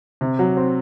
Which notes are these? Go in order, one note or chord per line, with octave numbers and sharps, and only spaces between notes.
C3
F#3
C4